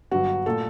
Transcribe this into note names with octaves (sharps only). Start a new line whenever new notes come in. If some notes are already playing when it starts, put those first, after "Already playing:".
G1 G2 F#3 F#4
A#2 A3 A4